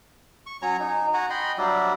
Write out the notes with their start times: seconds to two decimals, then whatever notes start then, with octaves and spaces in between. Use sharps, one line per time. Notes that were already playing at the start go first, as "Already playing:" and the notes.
0.46 C#6
0.62 F#3 C#4 C#5 A#5
0.80 D#4
1.14 F#4 F#5 G#5 A#5
1.30 D#5 G5 B5 C6
1.58 F#3 G3 D4 E5